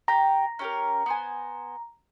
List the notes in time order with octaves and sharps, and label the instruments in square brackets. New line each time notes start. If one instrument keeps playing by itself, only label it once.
[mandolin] G4 G5 [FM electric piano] A#5
[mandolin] C#4 G4 A#4
B3 C5 G#5